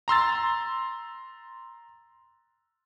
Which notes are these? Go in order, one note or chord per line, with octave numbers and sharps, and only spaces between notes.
A#5 C6 E6 A6